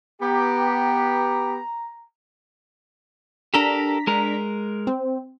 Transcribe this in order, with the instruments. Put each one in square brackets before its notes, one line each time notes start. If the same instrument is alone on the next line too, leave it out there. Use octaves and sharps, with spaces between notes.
[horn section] B3 G4 [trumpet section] A#5
[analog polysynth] D4 A#5 B6 [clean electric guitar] G4 A4 A#4
[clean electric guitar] G#3 A#4
[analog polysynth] C4